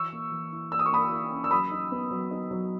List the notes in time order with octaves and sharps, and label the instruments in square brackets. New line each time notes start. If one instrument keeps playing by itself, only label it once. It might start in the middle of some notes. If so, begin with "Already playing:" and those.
Already playing: [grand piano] E3 [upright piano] C#6 E6
[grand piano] A#3
E3
E4
[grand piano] A#3 [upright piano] E6
[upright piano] D#6
C#6
[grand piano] A#3 [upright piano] B5 D#6
[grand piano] E4
C#4
[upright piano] E6
[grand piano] F#3 [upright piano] B5 D#6
[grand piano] D#4
B3
F#3
D#4
F#3